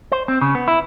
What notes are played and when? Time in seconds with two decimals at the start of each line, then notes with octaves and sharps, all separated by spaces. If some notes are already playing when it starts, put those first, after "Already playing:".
0.12 C5
0.28 C4
0.41 C#3
0.55 B3
0.68 E4